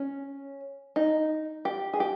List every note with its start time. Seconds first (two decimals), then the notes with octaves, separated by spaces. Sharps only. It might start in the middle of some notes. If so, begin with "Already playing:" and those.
Already playing: C#4
0.96 D#4
1.65 G4
1.93 G#4
2.00 G4